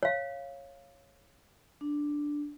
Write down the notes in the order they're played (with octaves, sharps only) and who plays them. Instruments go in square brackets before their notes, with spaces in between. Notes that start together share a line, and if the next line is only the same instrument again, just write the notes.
[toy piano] C#5 F5
[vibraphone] D4